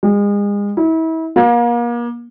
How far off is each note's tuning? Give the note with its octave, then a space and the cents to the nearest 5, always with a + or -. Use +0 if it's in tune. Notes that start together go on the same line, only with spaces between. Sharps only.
G#3 -35
E4 -35
A#3 +35